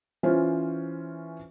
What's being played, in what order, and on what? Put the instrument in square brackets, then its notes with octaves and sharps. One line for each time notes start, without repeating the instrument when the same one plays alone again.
[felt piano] E3 C#4 F4 C5